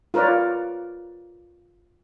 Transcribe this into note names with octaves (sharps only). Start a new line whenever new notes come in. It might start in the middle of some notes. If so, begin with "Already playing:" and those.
F4 A#4 B4 C#5 D5